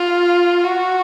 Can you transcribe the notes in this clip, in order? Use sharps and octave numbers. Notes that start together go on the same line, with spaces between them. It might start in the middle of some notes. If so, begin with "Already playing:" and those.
Already playing: F4
F#4